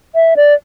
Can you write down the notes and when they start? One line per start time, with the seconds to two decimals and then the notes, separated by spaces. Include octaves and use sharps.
0.15 E5
0.36 D5